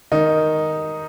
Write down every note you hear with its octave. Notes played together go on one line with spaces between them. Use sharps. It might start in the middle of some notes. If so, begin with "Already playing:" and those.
D#3 D#4